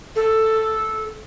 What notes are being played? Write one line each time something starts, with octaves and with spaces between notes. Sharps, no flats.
A4